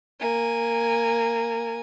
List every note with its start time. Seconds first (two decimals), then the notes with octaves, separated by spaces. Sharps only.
0.21 A#3 G#5